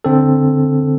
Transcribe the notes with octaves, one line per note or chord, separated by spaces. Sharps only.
D3 C4 A4